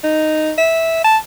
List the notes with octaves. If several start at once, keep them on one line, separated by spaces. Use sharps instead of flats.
D#4
E5
A5